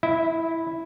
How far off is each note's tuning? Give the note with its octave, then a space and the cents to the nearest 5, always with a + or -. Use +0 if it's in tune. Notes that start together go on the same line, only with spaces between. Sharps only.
E4 +0 E5 -35